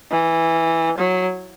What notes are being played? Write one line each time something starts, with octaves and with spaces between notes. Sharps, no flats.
E3
F#3